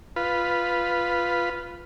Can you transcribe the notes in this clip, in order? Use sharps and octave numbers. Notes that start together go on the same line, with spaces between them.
F4 B4